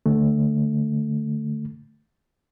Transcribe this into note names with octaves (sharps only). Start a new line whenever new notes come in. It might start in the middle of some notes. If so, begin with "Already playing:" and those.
D3 A3